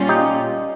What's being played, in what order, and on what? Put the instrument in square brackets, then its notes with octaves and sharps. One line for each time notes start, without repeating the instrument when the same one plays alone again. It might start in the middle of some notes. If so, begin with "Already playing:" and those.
Already playing: [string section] A#2 G3 C#4 F4
[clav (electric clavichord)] D#4 G4